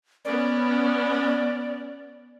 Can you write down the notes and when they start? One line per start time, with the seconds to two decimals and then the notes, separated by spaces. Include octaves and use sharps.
0.25 B3 C#4 D5